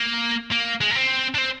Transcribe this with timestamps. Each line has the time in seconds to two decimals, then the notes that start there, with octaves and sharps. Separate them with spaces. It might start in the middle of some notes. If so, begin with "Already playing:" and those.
Already playing: A#3
0.52 A#3
0.81 G#3
0.91 A#3
0.96 C4
1.35 D4
1.38 C4